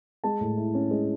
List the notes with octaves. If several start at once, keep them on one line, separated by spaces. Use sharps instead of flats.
G#3 A5
A2
E4
C#4
G#3